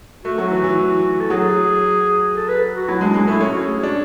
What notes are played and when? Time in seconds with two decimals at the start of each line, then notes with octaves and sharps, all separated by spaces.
0.25 A3 F#4
0.38 F#3
0.51 E3
0.64 E3
1.20 A4
1.30 F#3 G#4
2.36 A4
2.48 B4
2.76 F#4
2.88 F#3 E4
3.01 G#3 D4
3.14 G#3 D4
3.28 A3 E4
3.41 C#4 F#4
3.54 F#4
3.67 G#4
3.81 D4 F#4